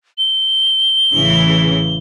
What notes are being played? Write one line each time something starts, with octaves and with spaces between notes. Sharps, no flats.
G7
A1 C#3 E3